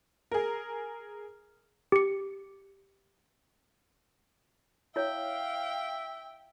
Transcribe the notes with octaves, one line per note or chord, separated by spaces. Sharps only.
G#4 A#4
G4 C#7
E4 C#5 E5 F5 G5